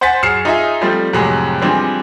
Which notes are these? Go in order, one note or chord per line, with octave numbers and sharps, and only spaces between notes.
C5 F#5 G#5 A6 B6
F#2 G#4 F6 C7 C#7 E7
D#4 F4 G#4 E5
F3 G3 A3 C4
F2 A2 C3 F#3 G#3
E3 F3 G3 G#3 C4 D4